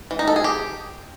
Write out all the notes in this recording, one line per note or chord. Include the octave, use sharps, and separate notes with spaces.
E3
D#4
A4
G#4
G4